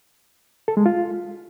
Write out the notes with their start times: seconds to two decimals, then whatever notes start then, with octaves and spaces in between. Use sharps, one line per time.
0.68 A4
0.77 G#3
0.86 F4